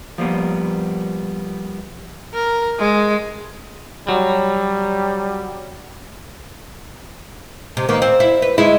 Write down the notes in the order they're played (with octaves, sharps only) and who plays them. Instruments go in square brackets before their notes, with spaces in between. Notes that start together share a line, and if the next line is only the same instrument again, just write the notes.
[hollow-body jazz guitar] F3 G3 A#3 B3
[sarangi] A#4
G#3
[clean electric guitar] F#3 [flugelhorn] G3
[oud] C3
D#3 A#3 B3
C4
E4
B4
D2 G#3 E4